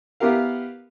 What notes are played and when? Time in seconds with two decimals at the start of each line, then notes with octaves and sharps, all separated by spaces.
0.20 B3 E4 G4 A#4 F5